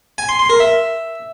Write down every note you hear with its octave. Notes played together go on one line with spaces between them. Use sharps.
G#5
C6
C6
A#4
E5